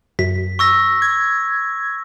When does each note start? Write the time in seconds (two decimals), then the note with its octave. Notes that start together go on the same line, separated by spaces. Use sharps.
0.19 F#2 B6
0.59 C#6 E6 A#6
1.02 G#6